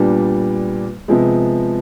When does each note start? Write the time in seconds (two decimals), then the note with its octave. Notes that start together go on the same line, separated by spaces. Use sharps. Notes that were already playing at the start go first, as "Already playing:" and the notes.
Already playing: A#2 G3 B3 D4
1.08 C3 F3 G#3 B3